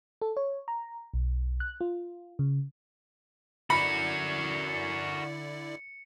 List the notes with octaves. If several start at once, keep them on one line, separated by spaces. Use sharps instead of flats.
A4
C#5
A#5
B1
F#6
F4
C#3
D3 E4 F#4 A#4 D5 B5 C#7